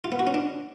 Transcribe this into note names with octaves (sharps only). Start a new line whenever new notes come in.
F4
B3
F#4
C#4
D4